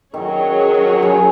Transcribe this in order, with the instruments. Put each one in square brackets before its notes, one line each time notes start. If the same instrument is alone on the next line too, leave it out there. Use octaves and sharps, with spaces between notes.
[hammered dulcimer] D#3 [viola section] F#3 C#4 G#4 C#5
[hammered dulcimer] C#3